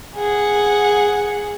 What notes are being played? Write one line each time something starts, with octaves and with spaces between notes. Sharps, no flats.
G#4 F#5